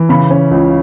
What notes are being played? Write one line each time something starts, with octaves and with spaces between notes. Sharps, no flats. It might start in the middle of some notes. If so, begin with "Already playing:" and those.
Already playing: E3
C#3 B5
C#4
C#2